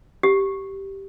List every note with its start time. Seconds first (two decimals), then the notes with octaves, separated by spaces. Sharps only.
0.23 G4